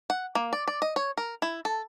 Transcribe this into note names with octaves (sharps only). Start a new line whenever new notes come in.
F#5
A#3
D5
D5
D#5
C#5
A#4
E4
A4